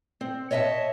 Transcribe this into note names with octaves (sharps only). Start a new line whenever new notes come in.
C4
C#5 D#5 E5 G#5 A5